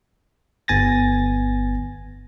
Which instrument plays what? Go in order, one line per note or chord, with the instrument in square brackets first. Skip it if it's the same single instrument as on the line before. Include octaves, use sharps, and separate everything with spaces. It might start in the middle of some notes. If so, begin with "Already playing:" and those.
[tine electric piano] G1 B3 G#5 A6 A#6